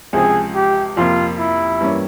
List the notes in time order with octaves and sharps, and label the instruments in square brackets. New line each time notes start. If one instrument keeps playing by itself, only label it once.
[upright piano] C#2 C3 F3 C4 [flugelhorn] G#4
[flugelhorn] G4
[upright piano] F2 C3 F3 A#3 [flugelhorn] F4
[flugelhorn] E4
[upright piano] G2 E3 A#3 C#4